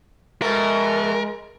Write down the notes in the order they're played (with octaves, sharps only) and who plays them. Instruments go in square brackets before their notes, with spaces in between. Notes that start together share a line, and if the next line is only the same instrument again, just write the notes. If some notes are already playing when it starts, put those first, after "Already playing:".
[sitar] B2 A3 [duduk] G#3 [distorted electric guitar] G#4 E5 [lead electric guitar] A#4